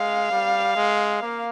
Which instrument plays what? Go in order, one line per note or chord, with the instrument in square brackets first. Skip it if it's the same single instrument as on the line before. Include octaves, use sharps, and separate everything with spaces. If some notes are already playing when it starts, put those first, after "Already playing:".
Already playing: [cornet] G#3 [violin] F5
[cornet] G3
G#3
A#3